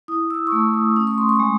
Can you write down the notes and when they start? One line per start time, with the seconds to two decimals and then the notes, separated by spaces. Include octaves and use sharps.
0.08 E4 D#6
0.30 E6
0.47 C#6
0.52 A3 D#6
0.74 D#6
0.96 C#4 D#6
1.07 C#6
1.18 C6
1.29 C#6
1.40 G#3